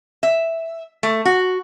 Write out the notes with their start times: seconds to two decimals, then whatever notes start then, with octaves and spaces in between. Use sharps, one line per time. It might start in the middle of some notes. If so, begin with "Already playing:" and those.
0.23 E5
1.03 A3
1.25 F#4